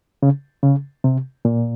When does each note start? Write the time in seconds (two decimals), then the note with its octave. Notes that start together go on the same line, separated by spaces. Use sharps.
0.23 C#3
0.63 C#3
1.04 C3
1.45 A#2